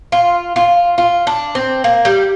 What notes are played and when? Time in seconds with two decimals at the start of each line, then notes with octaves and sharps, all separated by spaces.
0.12 F4
0.56 F4
0.98 F4
1.27 D4
1.55 C4
1.84 A#3
2.05 G3